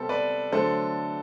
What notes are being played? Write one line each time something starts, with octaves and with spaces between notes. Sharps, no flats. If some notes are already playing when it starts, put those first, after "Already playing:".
Already playing: C3 G3 B3 A4 C5
B4 D5
D3 F#3 A3 D4 A4 C5